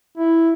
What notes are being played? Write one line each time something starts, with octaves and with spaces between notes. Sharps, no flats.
E4